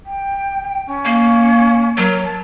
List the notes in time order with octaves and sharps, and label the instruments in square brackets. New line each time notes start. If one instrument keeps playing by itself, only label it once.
[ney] G5
C#4
[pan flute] A#3
[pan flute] F#3 [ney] A#4
[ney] A5